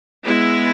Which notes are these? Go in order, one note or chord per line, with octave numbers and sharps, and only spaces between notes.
G#3 B3 E4